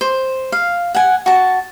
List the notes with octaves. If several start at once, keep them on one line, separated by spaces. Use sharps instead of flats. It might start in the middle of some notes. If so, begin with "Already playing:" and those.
C5
F5
F#5 G#5
F#4 A5